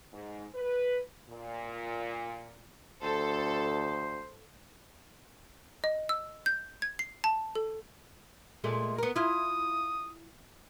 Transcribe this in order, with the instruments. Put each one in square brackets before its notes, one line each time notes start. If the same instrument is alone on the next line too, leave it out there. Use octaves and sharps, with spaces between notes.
[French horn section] G#2
B4
A#2
[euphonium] D2 [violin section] A4 [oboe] C5
[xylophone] D#5
E6
G6
G#6
C7
A5
A4
[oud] A#2 G#3 A3
B3 A#4
[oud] E4 F4 [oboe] D#6